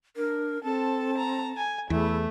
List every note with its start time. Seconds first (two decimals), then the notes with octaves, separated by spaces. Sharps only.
0.17 D4 A#4
0.64 C4 A4 A5
1.18 A#5
1.57 G#5
1.90 E2 A3 E4 G#4